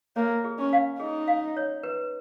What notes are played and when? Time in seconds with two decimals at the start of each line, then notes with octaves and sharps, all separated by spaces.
0.16 A#3 C#5
0.44 G#4
0.59 C#4
0.73 F5
1.00 D#4 G#4
1.28 F5
1.57 C#5
1.83 B4